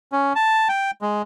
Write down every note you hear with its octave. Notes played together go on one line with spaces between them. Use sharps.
C#4
A5
G5
G#3